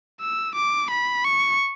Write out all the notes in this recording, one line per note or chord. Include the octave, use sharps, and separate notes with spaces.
E6
D6
B5
C#6